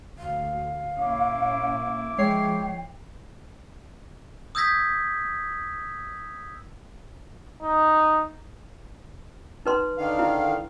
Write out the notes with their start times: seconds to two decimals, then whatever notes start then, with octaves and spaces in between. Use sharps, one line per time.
0.19 D2 F5
0.97 A#2 A#3 C#4 E4 D6
2.18 F3 G#3 C#5 G5 C7
4.55 D#6 E6 G6 G#6 A#6 B6
7.63 D#4
9.66 D#4 B4 C6
9.98 D3 D#3 F5
10.19 E4